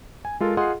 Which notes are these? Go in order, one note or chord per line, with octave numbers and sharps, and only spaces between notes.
G#5
G#3 F4 A4 A#4
F4 G#4 D#5 F#5 C6